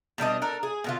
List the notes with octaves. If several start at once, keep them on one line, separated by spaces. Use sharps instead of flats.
B2 G3 D4 D#5
D4 A4 A#4
G#4
B2 D3 F4